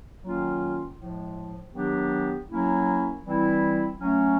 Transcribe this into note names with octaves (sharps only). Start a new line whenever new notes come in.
D#3 F#3 A#3 C#4 F4
A2 F3 G#3
D#3 F#3 B3 D4 G4
F#3 A#3 C#4 E4
E3 G3 C4 E4
F#3 A3 C#4